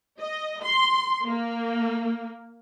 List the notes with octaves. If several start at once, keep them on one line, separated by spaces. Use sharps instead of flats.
D#5
C6
A#3